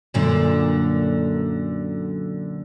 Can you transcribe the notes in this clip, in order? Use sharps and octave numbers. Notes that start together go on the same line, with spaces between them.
F#2 A#2 D3